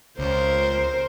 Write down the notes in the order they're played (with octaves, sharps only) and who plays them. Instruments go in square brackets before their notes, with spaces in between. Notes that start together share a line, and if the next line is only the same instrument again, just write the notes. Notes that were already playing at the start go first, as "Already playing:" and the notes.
[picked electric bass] C#2 [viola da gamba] A#4 C5